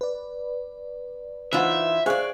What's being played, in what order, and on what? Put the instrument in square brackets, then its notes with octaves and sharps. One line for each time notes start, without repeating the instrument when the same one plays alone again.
[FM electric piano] B4 D5
[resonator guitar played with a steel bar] E3 D#4 F4 [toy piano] C5 F#5 [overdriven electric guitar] E5
[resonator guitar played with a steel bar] G#4 D5 [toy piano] C5 [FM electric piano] F5 C#6 F#6